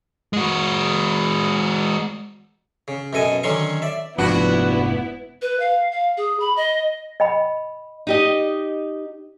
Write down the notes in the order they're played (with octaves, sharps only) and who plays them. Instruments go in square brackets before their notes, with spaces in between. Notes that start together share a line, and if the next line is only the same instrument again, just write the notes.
[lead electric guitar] G#3 F#4
[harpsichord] C#3
F#2 B2 A4 D#5 G#5
D3 D#3 F#3 C#4 C6 C#6
D5 E5
[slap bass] F1 G#2 F3 [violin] B3 E4 [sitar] D4 F#4 [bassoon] B4
[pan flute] B4
F5
F5
G#4
B5
D#5
[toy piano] D#5 G5 B5
[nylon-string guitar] D#4 G4 D#5